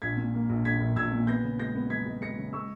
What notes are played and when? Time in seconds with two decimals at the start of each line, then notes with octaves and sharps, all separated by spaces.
0.02 A#1 G#6 B6
0.17 A#2
0.34 A#3
0.49 A#1
0.65 A#1 G#6 B6
0.80 A#1
0.96 A#1 E6 G#6
1.12 A#2
1.27 B3 G6 A#6
1.44 C#3
1.59 G#3 G6 A#6
1.75 B3
1.90 G#3 G#6 B6
2.06 G#3
2.22 G#3 A#6 C#7
2.38 C#3
2.53 G#3 C#6 E6